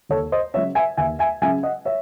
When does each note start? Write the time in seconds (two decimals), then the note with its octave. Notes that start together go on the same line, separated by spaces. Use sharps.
0.09 D#2 A4 C#5
0.32 C5 D#5
0.54 C#3 C#5 E5
0.57 F#3
0.75 E5 G#5
0.97 D#2 E5 G#5
1.19 E5 G#5
1.42 C#3 F#3 E5 G#5
1.63 D#5 F#5
1.85 C#5 E5